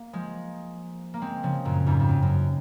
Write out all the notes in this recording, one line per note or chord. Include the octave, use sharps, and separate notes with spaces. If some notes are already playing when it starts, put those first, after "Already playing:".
Already playing: A#3
F3 G#3
A#3
G#3 C4
C#3 F3
F#2 A#2
F2 G#2
F2
F#2
F#2